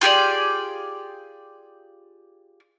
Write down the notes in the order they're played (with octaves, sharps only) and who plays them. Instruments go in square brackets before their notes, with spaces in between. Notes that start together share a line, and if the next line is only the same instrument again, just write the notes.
[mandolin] F4 G4 G#4 D5